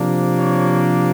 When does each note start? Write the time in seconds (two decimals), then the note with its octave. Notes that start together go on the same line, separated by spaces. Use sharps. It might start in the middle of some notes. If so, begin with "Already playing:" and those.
Already playing: C3 F3 A#3 D4
0.36 C#5